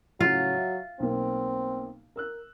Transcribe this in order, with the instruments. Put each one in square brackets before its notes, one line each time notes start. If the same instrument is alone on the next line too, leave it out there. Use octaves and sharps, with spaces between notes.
[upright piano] A2 C#3 [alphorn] F#3 [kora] F4
[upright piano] E5
[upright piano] B1 A#3 [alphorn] C4
[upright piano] A#4 E6 F#6